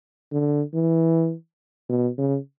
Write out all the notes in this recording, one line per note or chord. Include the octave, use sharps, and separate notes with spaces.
D3
E3
B2
C#3